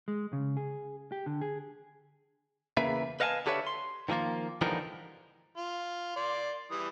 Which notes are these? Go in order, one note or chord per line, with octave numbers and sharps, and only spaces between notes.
G#3
C#3
G#4
G4
D3
G#4
E2 C#3 A#3 B4 E5
B4 D#5 F5 F#5 G#5 A5
D3 G4 A4 B4 C#5 E5
C6
D#3 F3 A3 A#3 F4
D3 E3 F3 G3 D#4 A#4
F4
D5 C6
E3 G3 D#6